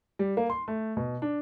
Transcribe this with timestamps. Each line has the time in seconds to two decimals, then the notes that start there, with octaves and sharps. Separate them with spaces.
0.19 G3
0.37 A#3
0.50 C6
0.68 A3
0.97 B2
1.22 D4